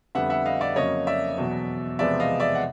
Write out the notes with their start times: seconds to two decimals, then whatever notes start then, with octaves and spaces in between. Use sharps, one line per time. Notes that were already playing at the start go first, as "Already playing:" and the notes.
0.15 F2 D3 G3 B3 E5 F#5
0.30 E5 F#5
0.46 D#5 F5
0.61 D5 E5
0.76 F2 C#3 F#3 A#3 C#5 D#5
1.07 D5 E5
1.38 E2 B2 F#3
1.99 E2 C3 F3 G#3 B3 D5 E5
2.20 D#5 F5
2.40 D5 E5
2.55 F#5